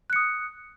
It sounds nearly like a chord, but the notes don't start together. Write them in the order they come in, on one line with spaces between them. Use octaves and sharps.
F#6 C#7 D#6